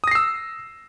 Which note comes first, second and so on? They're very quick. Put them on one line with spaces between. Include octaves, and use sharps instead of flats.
D#6 A#6 C7 E6